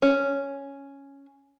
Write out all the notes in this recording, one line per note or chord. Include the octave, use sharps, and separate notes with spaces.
C#4